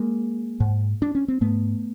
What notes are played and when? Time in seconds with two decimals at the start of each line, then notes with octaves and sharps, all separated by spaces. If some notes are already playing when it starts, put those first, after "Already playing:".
Already playing: G#3 A#3
0.60 G#2
1.02 D4
1.15 C#4
1.28 C4
1.41 G#2 A3 B3